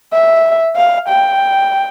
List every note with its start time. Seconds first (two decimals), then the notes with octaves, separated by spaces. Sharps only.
0.13 E5
0.76 F5
1.08 G5